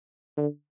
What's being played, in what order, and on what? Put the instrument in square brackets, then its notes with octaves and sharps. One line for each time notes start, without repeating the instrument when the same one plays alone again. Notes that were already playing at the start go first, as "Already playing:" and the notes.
[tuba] D3